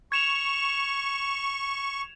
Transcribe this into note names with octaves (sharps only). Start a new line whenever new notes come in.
C#6 G#6 E7 F7